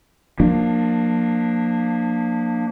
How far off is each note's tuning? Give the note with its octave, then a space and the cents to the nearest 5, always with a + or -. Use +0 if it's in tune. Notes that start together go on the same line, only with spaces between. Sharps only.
F3 +25 A#3 +0 D4 +25